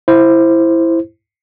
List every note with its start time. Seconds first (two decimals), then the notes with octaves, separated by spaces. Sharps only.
0.08 E4 C5